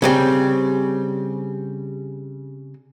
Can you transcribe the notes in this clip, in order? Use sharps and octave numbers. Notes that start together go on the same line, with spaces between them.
C#3 G3 C4